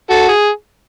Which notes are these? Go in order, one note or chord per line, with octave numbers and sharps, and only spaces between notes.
F#4 A4
G#4